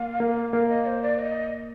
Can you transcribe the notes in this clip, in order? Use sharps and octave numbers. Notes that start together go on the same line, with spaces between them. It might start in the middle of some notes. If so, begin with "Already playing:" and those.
Already playing: A#3 F5
A#3
A#3 F5
D#5
C5
D5
D#5